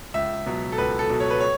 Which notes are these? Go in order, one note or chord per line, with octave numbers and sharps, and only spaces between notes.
C#2 E5
B2 F#3
A4
C#2 B4
A4
B2 F#3
C#5
B4
C#5